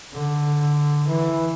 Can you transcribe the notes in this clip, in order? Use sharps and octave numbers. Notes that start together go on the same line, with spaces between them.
D3
E3